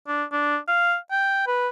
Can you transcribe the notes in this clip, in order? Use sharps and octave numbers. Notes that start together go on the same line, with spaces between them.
D4
D4
F5
G5
B4